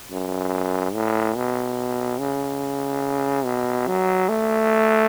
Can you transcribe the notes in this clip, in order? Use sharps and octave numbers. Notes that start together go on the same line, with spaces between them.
F#2
A2
B2
C#3
B2
F#3
A3